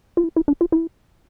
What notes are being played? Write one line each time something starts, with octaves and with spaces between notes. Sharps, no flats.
F4
E4
E4
D4
F4
E4